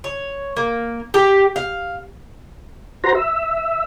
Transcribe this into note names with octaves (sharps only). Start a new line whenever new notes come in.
C#5
A#3
G4
F5
F#4 C5 A#5
E5